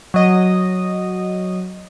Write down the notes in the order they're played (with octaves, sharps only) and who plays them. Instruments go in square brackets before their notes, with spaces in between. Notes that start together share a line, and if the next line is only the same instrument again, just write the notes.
[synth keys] F#3 D#5